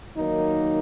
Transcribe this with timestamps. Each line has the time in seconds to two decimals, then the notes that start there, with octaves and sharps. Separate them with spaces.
0.18 D#3 F#3 A#3 D#4